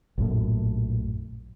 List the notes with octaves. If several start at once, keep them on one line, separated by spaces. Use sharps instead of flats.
A#1 F#2 A2